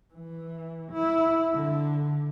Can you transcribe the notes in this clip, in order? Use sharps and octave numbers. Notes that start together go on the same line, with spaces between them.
E3
E4
D3